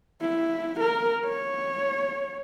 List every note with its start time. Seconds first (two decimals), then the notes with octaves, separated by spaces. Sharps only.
0.21 E4
0.80 A#4
1.25 C#5